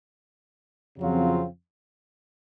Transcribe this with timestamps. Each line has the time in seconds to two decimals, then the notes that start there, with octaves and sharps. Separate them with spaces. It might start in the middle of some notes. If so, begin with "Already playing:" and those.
0.97 F2 C#3 F#3 C4 F4